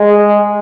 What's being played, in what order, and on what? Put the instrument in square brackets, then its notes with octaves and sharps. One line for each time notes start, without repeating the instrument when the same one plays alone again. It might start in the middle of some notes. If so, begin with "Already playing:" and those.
Already playing: [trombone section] G#3